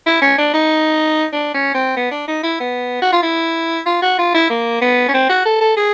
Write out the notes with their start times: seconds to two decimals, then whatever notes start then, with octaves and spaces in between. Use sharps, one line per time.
0.06 E4
0.21 C#4
0.38 D4
0.53 D#4
1.32 D4
1.54 C#4
1.74 C4
1.96 B3
2.11 D4
2.28 D#4
2.43 E4
2.60 B3
3.02 F#4
3.12 F4
3.23 E4
3.86 F4
4.02 F#4
4.18 F4
4.34 E4
4.49 A#3
4.81 B3
5.08 C#4
5.14 C4
5.29 F#4
5.45 A4
5.61 A4
5.77 G#4